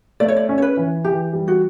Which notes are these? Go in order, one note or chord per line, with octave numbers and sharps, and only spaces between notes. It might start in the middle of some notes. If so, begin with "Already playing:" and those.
A3 D5
C#5
D5
C#4
C#5
B4
E3
E3 G4
G3
F#4